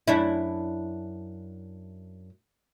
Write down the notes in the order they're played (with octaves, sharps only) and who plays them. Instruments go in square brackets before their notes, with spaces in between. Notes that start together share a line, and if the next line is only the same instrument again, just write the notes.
[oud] F#2 D4 E4